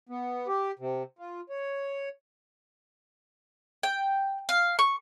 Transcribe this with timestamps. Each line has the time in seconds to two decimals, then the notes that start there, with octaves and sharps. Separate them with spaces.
0.09 B3
0.48 G4
0.79 C3
1.19 F4
1.50 C#5
3.83 G5
4.49 F5
4.79 C#6